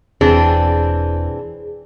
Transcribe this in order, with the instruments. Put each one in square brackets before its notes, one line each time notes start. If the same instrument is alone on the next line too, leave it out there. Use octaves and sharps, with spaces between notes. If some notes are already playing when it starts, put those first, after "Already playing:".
[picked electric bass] E1 [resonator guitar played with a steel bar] E3 C4 D4 [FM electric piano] G#4